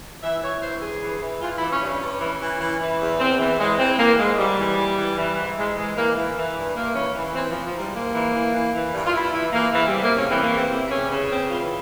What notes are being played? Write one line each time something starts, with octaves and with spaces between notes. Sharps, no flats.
E3 E5
E3 C#5
G2 C5
G2 G#4
E3
E3
E3 F4
E3 E4
C#4
G2
C#4
G2
E3
E3
E3
E3
E2
E2 C4
E3
E3 G#3
E3 C4
E3 A#3
G#2 G#3
G#2 G3
E3
E3
E3
E3
G#2
G#2 G#3
E3 G#3
E3 A#3
E3
E3
G2
G2 A#3
E3 C#4
E3
E3 C4
F3
E3
F3
G#2 G3
G#2 A#3
E3
E3
E3
E3
G2
F4
G2 E4
E3 E4
E3 A#3
E2 E3
G3
C3
A#3
E2
C#4
E3 C4
A#3
E2
C4
C3
E4
E2 C#4
C#3 C#4
E2 C4
E3 F4